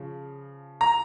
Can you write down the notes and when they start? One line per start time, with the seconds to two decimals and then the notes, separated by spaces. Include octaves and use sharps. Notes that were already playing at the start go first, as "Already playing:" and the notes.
Already playing: C#3 F3
0.81 A#5